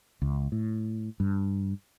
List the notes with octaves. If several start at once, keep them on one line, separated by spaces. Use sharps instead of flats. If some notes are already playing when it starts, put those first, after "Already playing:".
C#2
A2
G2